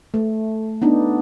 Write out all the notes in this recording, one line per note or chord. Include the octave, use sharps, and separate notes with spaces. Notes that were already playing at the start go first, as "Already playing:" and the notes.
A3
B3 D4 D#4